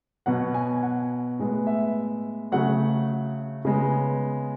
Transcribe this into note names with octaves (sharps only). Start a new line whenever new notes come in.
B2 F#3 B3 F#5
G#5
F#5
A2 G#3 B3
E5
C#3 F#3 A3 F#5
C#3 G#3 B3